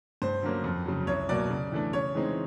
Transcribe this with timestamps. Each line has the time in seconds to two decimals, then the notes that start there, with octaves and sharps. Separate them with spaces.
0.22 G2 C5
0.42 D3 F#3 A#3 C#4
0.64 F2
0.86 C#3 F#3
1.07 C2 C#5
1.29 B2 F#3 A#3 D5
1.50 C#3
1.72 E3 A3 D4
1.93 C#3 C#5
2.15 E3 G#3 C4 D#4